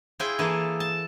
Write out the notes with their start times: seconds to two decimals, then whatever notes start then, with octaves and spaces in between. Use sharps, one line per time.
0.20 E4 F4 G#4 G5 G#5
0.39 E3 A#3 G#4 A4
0.80 A5